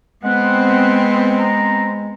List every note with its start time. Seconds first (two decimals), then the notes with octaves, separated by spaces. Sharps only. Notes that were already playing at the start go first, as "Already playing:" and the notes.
0.24 G#3 B3 C4 F#5
1.39 A#5